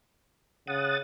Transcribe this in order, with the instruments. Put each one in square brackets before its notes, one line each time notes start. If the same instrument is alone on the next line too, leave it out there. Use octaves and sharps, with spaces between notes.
[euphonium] C#3 [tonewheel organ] F#5 D#6 A6